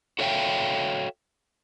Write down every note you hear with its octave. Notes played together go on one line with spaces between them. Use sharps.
F#4 A4 C#5 E5 F5 G5